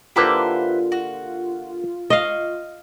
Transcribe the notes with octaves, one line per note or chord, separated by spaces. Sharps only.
D3 A#3 E4 F4 G4 B4 C5
F#4
D#5 F5 C#6